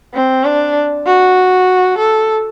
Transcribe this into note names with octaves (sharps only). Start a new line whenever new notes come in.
C4
D4
F#4
A4